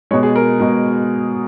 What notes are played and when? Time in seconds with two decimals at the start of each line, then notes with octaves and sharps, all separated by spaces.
0.11 B2 G#3 C#5
0.23 G#4
0.36 A#4
0.60 B2 G#3